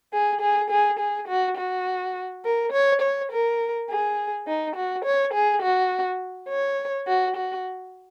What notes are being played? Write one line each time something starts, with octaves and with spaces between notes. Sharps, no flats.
G#4
G#4
G#4
G#4
F#4
F#4
A#4
C#5
C#5
A#4
G#4
D#4
F#4
C#5
G#4
F#4
C#5
F#4
F#4